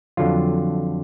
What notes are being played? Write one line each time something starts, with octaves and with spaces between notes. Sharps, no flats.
F2 D3 F#3 F4